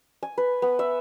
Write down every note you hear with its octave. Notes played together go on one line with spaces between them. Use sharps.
G#5
B4
B3
E5